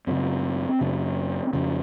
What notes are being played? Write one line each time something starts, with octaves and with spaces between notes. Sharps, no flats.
F#2 C#3 C4
F#2 C#3
F2 C#3 C#4